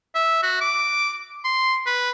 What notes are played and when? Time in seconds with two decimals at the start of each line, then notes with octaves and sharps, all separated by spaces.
0.15 E5
0.42 F#4
0.61 D6
1.44 C6
1.86 B4